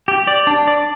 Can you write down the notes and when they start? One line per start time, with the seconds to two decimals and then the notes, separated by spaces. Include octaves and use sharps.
0.08 G4
0.27 D5
0.47 D4
0.68 D5